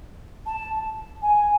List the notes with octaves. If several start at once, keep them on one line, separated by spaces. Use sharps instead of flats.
A5
G#5